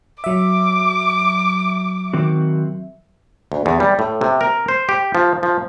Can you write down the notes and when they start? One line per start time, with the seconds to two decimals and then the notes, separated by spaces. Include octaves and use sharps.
0.24 F#3 E5 D6
2.13 D#3 C4 F#4
3.52 D2
3.66 E2
3.80 G3
3.99 A2
4.21 C3
4.41 A#4
4.68 C5
4.89 G4
5.15 F3
5.43 F3